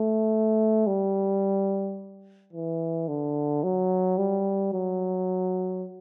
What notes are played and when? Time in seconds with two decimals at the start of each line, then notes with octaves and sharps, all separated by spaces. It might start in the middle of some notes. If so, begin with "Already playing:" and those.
Already playing: A3
0.87 G3
2.53 E3
3.08 D3
3.63 F#3
4.18 G3
4.73 F#3